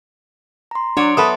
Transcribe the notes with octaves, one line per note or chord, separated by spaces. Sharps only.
A#5 C6
F#3 D4 C#5 D5 C6
B3 A4 B4 E5 B5 D#6